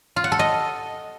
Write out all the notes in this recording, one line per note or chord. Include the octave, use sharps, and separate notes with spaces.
F4
F#5
A4
D#5